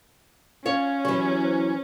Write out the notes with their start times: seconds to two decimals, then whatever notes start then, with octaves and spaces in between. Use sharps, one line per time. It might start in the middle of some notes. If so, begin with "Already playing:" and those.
0.65 C#4 F4 C#5
1.05 E3 F#3 G4
1.45 C5